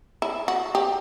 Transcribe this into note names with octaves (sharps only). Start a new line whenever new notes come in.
E4
F#4
G4